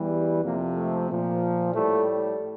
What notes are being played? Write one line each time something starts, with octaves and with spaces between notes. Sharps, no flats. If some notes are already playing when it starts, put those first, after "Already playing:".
Already playing: E2 E3 G3
F2 C3 F3 A#3
A3
A#2 F3
A2 G3 A3